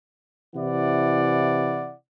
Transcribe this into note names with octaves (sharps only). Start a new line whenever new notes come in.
C3 E3 E4 D5 F#5